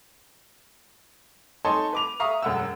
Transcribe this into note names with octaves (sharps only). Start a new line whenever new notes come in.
D#4 A4 C#5 G#5 A5 C6
B4 D6 F7
E5 F5 A#5 C#6 D#6
E1 F#2 F#5 E6